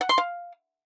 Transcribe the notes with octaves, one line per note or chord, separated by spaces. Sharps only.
F#5
C6
F5